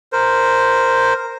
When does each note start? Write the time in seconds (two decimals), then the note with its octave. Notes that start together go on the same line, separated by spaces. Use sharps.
0.12 A#4 C5